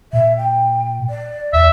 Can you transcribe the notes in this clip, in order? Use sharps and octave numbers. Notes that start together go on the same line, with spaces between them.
A#2 E5
G5
D5
E2 E5